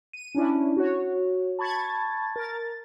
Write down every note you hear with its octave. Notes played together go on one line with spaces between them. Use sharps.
D#7
C#4 D4 E4
F#4 C#5
A5 B5 C#6 G#6 A6
A#4 A6